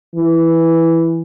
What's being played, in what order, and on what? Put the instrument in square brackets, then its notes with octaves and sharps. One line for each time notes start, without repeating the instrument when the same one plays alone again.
[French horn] E3